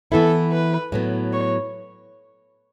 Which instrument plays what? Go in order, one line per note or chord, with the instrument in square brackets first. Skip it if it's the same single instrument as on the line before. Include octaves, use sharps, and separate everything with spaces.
[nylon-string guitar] E3 B3 E4 [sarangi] A4
[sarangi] B4
[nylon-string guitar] A2 F#3 B3
[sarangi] C#5